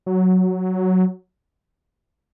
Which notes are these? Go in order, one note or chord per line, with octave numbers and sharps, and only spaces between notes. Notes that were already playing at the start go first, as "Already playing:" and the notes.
F#3